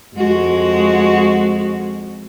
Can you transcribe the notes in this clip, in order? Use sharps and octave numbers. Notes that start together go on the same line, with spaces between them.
F2 G#3 F#4